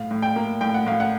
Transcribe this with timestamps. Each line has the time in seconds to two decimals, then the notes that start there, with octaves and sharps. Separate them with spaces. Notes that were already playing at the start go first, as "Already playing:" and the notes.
Already playing: A2 F5
0.11 A2
0.22 G5
0.36 A#3
0.61 A2 G5
0.74 F#5
0.86 A2 F5
1.00 F#5